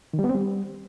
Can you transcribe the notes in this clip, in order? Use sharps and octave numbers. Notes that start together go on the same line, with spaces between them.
D#3
G3
B3
C4
G3